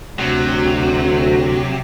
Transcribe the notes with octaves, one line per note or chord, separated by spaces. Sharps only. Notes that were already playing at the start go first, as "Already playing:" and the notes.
D2 C3 F#3